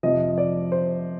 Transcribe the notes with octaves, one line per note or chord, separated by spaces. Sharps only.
F2 C3 F3 D#5
D5
C5